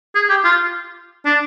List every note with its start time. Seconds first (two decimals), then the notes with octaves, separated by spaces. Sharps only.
0.15 G#4
0.30 G4
0.44 F4
1.25 D4